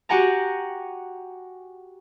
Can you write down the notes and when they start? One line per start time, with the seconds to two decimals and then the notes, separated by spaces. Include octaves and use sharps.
0.09 F#4 G4 F#5 G#5 A#5